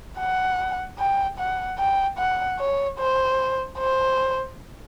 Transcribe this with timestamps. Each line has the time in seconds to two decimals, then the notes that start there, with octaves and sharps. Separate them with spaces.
0.19 F#5
0.99 G5
1.38 F#5
1.79 G5
2.18 F#5
2.59 C#5
2.99 C5
3.78 C5